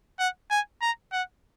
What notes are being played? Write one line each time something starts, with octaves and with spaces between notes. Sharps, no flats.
F#5
G#5
A#5
F#5